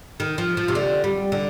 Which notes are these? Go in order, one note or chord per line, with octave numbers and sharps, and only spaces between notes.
D#3
F3
F3
C3
D3
G3
D3